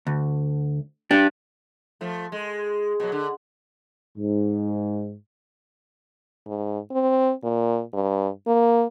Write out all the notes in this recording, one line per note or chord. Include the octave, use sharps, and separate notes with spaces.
D2
D4 G4
F3 A3
G#3
B2 F#3
D3
G#2
G#2
C4
A#2
G2
A#3